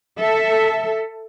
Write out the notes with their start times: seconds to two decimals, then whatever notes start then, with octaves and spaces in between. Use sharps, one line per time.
0.17 A4 E5